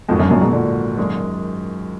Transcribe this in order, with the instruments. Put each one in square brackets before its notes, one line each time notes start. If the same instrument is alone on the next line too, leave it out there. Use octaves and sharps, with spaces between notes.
[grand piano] A#1 G#2 D#3 F#3 D4 [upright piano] F2
[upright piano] F#2
F#2 A#2
G#2 B2
A#2 D3
[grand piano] F#2 D#3 G#3